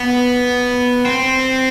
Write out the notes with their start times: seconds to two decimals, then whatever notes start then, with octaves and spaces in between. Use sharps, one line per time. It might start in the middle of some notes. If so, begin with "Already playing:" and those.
Already playing: B3
1.05 C4